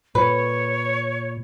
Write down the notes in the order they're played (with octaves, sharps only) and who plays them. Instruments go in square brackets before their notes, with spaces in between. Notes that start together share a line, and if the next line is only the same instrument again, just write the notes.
[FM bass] A#2 [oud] B4 [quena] C#5